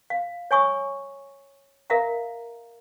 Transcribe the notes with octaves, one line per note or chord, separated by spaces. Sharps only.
F5
C#5 G#5 C#6 D#6
A#4 E5 F5 A#5